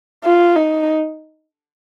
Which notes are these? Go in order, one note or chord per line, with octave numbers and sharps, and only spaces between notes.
F4
D#4